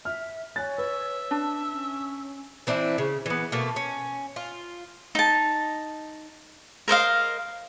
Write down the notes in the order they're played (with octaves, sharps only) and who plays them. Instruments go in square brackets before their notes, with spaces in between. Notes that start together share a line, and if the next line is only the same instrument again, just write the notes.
[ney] E5 [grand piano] F6
[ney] C#5 [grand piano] G#5 F#6 A6
[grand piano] B4 [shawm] E5
[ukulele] D4 [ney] A5
[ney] C#4
[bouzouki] E3 C4 D4 E4
C#3
E3 B3
B2 A3 A#3
C#4
F4
[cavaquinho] D#4 A5
A#4 C5 D#5 F5